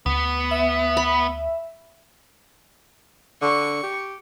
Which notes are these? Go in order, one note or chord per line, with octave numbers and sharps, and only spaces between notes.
D2 B3
E5
B5
D3 C#6
G4